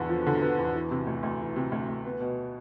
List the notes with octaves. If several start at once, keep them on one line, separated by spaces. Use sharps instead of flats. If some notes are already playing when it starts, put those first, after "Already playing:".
Already playing: E2 D3 B3
F3
D3
B3
E2
E3
C3
D2
D2
E3
C3
D2
D2
B3
B2